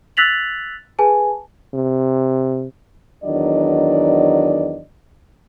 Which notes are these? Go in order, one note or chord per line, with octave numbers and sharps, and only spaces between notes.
E6 F#6 A6 B6 F7 F#7
G#4 B4 G#5 A5
C3
E2 D#3 F#3 D4 D5 D#5